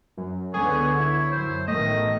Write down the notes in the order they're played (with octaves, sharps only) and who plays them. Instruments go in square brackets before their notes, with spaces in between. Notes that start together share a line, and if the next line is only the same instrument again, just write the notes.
[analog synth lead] F#2
[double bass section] C#2 D3 B3 [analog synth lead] G#4 [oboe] C#5
[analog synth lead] E4
[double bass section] F#2 [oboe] C5
[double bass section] A1 B2 D#3 [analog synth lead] A3 [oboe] D#5